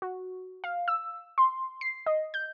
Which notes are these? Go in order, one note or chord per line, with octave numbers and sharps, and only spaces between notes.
F#4
F5
E6
C6
C7
D#5
G6